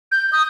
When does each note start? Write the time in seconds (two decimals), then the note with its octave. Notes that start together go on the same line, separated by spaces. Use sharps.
0.12 G6
0.32 D#6